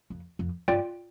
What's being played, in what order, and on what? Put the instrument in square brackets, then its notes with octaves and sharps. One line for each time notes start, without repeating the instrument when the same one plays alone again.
[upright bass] F2
F2
[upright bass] G2 [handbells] F4 D5 G5